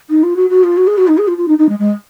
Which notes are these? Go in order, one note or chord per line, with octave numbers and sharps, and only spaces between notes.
D#4
F4
F#4
F#4
F4
F#4
G#4
F#4
D#4
G#4
F4
F4
D#4
D#4
G#3
G#3